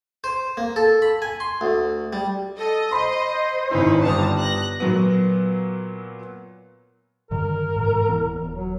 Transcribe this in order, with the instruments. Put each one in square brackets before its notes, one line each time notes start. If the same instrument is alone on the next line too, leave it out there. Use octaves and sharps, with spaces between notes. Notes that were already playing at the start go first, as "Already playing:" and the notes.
[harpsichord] C5
A#3
A4
B5
G#5
C6
D2
G3
[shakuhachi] A4 [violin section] D#5
[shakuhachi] C5 [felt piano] B5 C6
[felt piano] G#1 D#4 E4 [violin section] C#4 B4
[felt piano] G1 G3 D#6 [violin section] A5 A#5
[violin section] F#6 A#6
[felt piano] A#2 F#3 B3
[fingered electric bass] G2 D3 D#3 [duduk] A#4
[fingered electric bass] G#2 B2 E3
D#1 E3 B3
D#1
[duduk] F#3